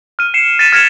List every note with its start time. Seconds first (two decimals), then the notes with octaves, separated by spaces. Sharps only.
0.19 F6 D#7
0.34 C7 C#7 E7
0.59 A6 B6 C#7 D#7 E7
0.72 F6 G#6 A#6 C#7 E7 F7